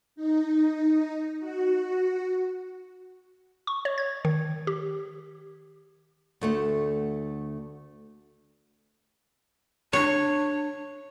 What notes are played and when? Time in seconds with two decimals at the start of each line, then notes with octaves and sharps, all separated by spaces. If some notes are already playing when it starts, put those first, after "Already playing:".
0.16 D#4
1.40 F#4
3.67 C#6
3.85 C#5
3.98 G#6
4.25 D#3
4.67 G4
6.41 D2 A3 F#5
9.93 D4 C#5